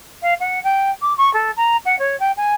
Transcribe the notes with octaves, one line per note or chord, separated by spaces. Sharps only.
F5
F#5
G5
D6
C#6
A4
A#5
F#5
C#5
G5
G#5